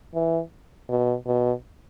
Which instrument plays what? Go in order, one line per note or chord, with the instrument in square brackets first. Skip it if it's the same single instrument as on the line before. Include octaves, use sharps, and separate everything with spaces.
[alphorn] E3
B2
B2